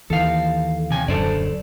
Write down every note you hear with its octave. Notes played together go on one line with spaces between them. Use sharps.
D#2 E3 A4 F5
C3 G#5
D#1 F#2 D3 A4 C5 D5